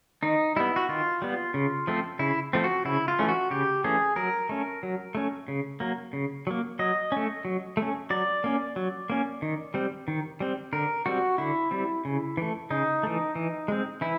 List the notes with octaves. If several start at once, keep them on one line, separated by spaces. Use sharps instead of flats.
D#3 D#4
G3 B3 E4
F#4
D#3 F4
G3 B3
C#3
F3 A3 C4
C#3 E4
F3 A3 C4
F#4
C#3 E4
F4
E3 A3 C#4
F#4
C#3 G4
E3 A3 C#4 G#4
F#3 A#4
A3 C#4
F#3
A3 C#4
C#3
F#3 A#3
C#3
F#3 A#3
F#3 D#5
A3 C#4
F#3
A3 C#4
F#3 D5
A#3 C#4
F#3
A#3 C#4
D#3
G3 C4
D#3
G3 C4
D3 A#4
G3 C4 F#4
D3 E4
G3 C4
C#3
E3 A3
C#3 D#4
E3 A3
E3
G#3 C4
E3 E4